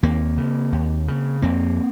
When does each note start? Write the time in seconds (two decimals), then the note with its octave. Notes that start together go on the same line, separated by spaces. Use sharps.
0.03 D#2 A#3 C4
0.38 C#3
0.72 D#2
1.08 C#3
1.42 F2 A#3 C4